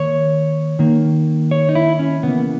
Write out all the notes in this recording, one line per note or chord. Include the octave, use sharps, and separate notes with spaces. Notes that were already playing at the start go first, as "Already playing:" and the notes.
Already playing: D#3 A#3 C#5
D#3 A#3
C#5
D#4
E4
C#4
C#3 E3 A#3 B3